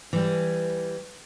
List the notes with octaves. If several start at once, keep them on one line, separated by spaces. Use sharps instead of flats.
E3 G3